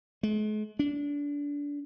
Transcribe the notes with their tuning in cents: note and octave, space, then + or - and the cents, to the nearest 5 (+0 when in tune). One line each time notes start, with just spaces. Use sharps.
G#3 +45
D4 -25